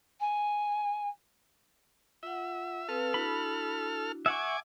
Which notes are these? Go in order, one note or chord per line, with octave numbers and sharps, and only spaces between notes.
G#5
F4 E5 F#5
C4 A4 B4 F5 F6
D4 E4 F#4 B5
E5 F#5 G#5 C#6 D6